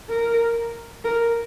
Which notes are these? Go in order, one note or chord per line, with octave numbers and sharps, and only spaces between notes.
A#4
A#4